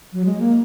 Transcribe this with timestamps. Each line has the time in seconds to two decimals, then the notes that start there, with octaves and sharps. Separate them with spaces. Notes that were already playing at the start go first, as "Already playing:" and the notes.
0.13 F#3
0.26 G#3
0.39 A#3